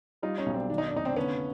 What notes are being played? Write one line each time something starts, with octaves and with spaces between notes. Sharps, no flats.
G3 D#4 F4
C#4 D#4
B1
C4 D4
D#3 D4
D#4
D4
F1 D#4
C4 D4
D3 B3 C#4